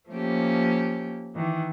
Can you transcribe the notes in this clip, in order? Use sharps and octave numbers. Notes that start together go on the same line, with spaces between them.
F3 A3 A#3 C#4 G4
D#3 E3